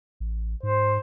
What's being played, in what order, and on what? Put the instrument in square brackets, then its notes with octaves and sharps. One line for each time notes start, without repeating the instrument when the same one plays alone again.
[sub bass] A1
[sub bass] G#2 [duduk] C5